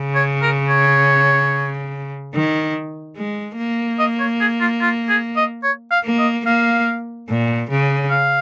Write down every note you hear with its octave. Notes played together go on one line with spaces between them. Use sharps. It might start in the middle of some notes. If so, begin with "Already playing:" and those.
Already playing: C#3
C#5
A#4
C#5
D#3
G#3
A#3
D#5
C#5
G#4
F4
F4
G#4
D#5
C#5
F5
A#3
D#5
A#3 F5
A#2
C#3
F5